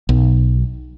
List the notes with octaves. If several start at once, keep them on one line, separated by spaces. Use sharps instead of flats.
B1